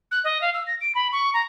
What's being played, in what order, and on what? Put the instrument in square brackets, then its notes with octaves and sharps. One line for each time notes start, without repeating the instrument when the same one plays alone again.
[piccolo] F#6
D#5
F5
E6
A#6
D7
B5
C#6
A#5